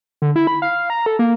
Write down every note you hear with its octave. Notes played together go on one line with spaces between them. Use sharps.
D3
E4
B5
F5
A#5
A4
A#3